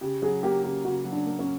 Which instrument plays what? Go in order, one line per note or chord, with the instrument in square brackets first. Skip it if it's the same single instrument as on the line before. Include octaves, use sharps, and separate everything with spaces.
[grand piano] C#3 [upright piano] G4
[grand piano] F#3 [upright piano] G#4
[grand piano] A#3 [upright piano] G4
[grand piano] C#3 [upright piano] G4
[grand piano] C#3 [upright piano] F#4
[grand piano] F#3
[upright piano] D4
[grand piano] A#3
[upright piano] C#4